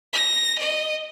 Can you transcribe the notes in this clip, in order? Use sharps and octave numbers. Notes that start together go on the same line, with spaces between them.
A#6
D#5